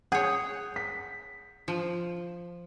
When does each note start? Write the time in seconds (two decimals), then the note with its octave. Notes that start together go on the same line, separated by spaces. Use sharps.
0.12 G#4 C#5 F#5 G6
0.76 B6
1.68 F3